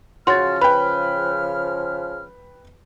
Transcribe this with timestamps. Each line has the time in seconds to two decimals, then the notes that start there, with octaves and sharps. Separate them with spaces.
0.27 C#3 F3 F#4 C#5 C6 F6 A6
0.61 B4 G5 B5